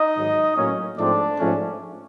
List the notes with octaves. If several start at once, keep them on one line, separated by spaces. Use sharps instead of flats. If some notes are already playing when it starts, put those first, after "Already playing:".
Already playing: D#4 D#5
G#2 D#3 F#3
A2 F#3 A#3 C#4
G#2 F3 A3 C4 D4 D5
G#2 F3 A3 C#4